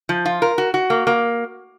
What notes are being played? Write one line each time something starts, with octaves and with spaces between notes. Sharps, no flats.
F3
F4
A#4
F#4
F#4
A#3
A#3